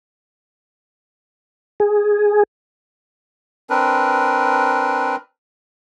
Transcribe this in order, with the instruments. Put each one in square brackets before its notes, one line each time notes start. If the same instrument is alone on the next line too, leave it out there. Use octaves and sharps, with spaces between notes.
[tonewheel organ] G#4
[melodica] C4 D4 A#4 B4